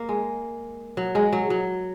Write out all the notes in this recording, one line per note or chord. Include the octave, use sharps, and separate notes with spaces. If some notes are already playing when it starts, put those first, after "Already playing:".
Already playing: A#3
G#3
F#3
G#3
F#3
F#3